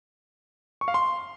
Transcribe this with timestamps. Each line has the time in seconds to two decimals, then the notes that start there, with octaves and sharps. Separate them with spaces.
0.81 C#6
0.88 F5
0.94 C6